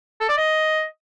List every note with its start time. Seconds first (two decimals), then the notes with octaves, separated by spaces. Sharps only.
0.21 A4
0.29 D5
0.37 D#5